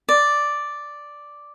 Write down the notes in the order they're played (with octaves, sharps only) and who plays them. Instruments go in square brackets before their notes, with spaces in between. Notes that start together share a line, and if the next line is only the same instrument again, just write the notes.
[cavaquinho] D5